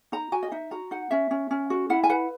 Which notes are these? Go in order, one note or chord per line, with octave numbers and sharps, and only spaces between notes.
D#4 A#5
F#4 G#5
D#5
D#4 E5
F#4 A#5
D#4 F#5
C#4 E5
C#4
C#4
F#4
E4 F#5
G#5
B4 F#5